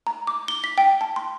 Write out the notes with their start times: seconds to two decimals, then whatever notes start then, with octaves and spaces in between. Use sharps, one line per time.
0.07 A#5
0.27 D6
0.48 G7
0.64 B6
0.78 G5
1.01 A5
1.16 C6